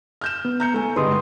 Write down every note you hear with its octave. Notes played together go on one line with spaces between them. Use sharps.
F6 G6 E7
B3
A#5 G6 C#7
A3 G#5
G2 D3 G#3 B4 C6 D#6